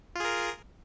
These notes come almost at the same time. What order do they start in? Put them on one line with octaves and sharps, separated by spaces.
F4 G#4 A#4